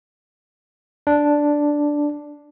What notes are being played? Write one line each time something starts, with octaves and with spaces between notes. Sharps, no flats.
D4